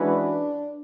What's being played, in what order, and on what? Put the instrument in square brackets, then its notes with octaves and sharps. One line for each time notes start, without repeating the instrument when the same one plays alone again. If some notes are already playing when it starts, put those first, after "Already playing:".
Already playing: [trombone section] E3 G#3 C#4 F#4 B4 [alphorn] D4